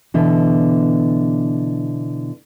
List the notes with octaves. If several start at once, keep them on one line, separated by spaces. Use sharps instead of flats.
B2 D3 E3